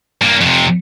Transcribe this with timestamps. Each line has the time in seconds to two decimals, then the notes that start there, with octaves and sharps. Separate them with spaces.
0.21 G2 A#3
0.41 F2 C3